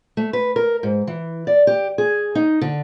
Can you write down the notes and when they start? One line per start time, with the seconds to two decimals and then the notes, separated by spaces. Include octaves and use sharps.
0.17 A3
0.33 B4
0.56 A#4
0.83 G#2
1.07 E3
1.47 D5
1.67 G4
1.98 G#4
2.35 D#4
2.61 D3